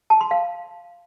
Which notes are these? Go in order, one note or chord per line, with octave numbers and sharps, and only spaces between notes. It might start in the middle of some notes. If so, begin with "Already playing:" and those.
A5
C6
F5